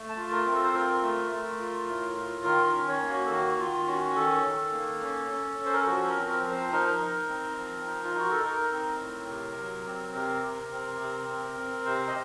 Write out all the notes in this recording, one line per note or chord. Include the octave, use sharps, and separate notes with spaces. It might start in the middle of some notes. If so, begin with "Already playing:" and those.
Already playing: A3
A5
F4
A#4
C4
A4
C5
F4 A#4
A3
A3
F4
A2
F4
D#3 A#4
A#4
C#4
C#5
A#3
F#4
A4
D#3 F#4
D#3 F4
C#4 F#4
D#3 A4
D#3
A#3
C#4
C#4
C#4
C5
A#4
A4
F3 F#4
A#4
C4
A#4
F3
C5
D#4 A#4
D#4
C4
F3
D#4
F4
D#4 F#4
A4
D#4 A#4
C4
A2
C3
F#3
C4
C3 A#4
C3
C4
C3
C4
C4
C3 C5
D#5